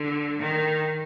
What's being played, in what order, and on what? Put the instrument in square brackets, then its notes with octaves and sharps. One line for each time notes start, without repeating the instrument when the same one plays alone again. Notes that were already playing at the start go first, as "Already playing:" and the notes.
Already playing: [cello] D3
D#3